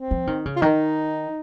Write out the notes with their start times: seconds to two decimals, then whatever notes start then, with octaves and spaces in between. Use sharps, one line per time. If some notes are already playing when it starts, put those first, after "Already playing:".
Already playing: C4
0.11 F3
0.27 D#3
0.46 C#3
0.56 F4
0.62 D#3 D#4